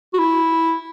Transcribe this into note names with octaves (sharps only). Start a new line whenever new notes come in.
F#4
E4